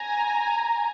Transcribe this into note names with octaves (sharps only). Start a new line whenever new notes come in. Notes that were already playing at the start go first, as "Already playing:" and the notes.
Already playing: G#5 A#5